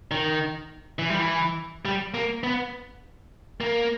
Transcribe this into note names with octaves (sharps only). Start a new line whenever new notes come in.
D#3
E3
G3
E3
G3
A#3
B3
A#3